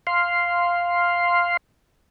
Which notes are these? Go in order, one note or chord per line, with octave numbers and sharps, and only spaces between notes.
F5 C6